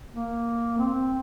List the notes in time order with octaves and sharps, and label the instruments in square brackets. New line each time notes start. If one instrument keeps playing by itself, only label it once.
[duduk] A#3
C4